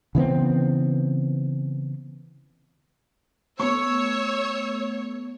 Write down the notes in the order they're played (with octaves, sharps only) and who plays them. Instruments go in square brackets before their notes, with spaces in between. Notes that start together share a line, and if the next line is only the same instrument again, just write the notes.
[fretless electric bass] C#3 E3 B3 C4
[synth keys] A3 B3 [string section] C#5 [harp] C#6 [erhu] E6